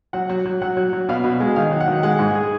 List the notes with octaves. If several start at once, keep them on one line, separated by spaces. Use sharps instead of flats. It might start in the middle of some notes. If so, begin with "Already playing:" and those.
F#3 F#5
F#3
F#3
F#3 F#5
F#3
F#3
B2 F5
B2
G#3
D#3 F5
F#3
F#5
D#3
G#3 F#5
G#2
G#4